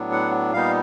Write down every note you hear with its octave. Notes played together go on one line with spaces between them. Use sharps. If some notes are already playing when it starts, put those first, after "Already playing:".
Already playing: A2 F#3 B3 D4
F#5
A#2 G3 B3 D#4 F5